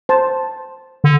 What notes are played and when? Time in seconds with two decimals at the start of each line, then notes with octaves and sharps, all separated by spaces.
0.09 C5 A5
1.04 D3